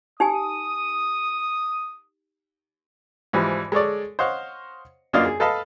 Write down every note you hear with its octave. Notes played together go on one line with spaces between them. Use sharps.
D#4 G4 G#5 D#6
G#2 E3 F3 G3
G#3 A4 C#5 D5
C5 C#5 D#5 F5 F#5
F#2 A#3 D4 F4 D#5 F5
G#4
A4 B4 D#5 F5 A5 B5